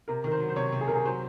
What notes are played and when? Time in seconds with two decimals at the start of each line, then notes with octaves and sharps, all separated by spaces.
0.08 C3 A#4
0.24 D#3 A#4
0.32 C5
0.40 F#3
0.49 C5
0.56 C3 C#5
0.72 C3
0.81 G#4
0.88 C3 A#4
0.95 G#4
1.05 F#3 C5